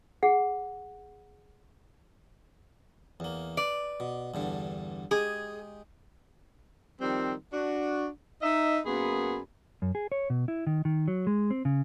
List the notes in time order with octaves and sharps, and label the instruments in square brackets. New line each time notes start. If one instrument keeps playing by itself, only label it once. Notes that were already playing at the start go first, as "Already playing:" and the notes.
[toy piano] G#4 F#5
[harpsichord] E2 A#3
[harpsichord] B4 [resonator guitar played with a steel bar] D5
[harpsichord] B2
E2 G2 D3
[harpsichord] G#3 G4 [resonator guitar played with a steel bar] G#4
[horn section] D#3 F3 G3 C4
D4 F#4
D#4 D#5 E5
F#2 A#3 B3 G#4 B5 C6
[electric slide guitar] F#2
G#4
C#5
B2
E4
D#3
D#3
F#3
G#3
C4
C#3